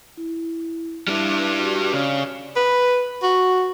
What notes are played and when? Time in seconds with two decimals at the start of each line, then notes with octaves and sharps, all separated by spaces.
0.17 E4
1.08 G3 D4 E4 E5
1.58 F#4 G4
1.93 C#3 C#5 D5
2.56 B4
3.23 F#4